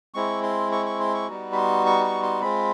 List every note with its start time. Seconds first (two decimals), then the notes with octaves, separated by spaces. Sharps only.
0.14 G#3 C4 E4 C#6
0.43 C6
0.72 C#6
0.86 C#6
1.00 C6
1.14 C#6
1.28 G3 B3 D#4 F#4
1.52 B5
1.57 C6
1.86 C#6
2.04 C#6
2.23 C6
2.41 G#3 C4 F4 B5